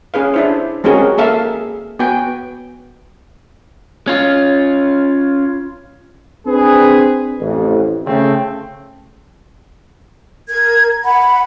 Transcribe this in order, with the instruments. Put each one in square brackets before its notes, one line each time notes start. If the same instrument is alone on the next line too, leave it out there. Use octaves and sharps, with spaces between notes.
[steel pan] C#4 G#4 B4 F5
D4 E4 C5
G#3 C4 C#4 F#4 G#4 A#4
A#3 A4 E5 F5
G#4
B3 F#4 B4 G5 G#5
[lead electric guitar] C#4 F4
[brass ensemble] C4 D4 G#4 B4
A1 F2
C#3 A3 C4
[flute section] A#4 G#6
F#5 B5